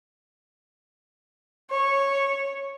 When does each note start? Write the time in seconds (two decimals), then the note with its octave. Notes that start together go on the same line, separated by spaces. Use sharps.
1.70 C#5